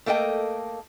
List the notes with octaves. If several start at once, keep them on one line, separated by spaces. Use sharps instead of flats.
A3 A#3 A4 D#5 G5